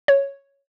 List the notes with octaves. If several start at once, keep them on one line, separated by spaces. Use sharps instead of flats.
C#5